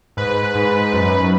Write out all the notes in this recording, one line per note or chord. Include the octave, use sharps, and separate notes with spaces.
G#2 B4
G#2
F#2